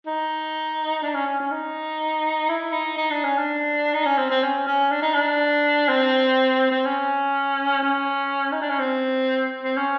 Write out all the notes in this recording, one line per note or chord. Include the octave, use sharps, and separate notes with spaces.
D#4
D4
C#4
C#4
C#4
D#4
E4
D#4
D#4
D4
C#4
D4
D#4
C#4
C4
C4
C#4
C#4
D4
D#4
D4
C4
C4
C#4
C#4
D#4
D4
C#4
C4
C4
C#4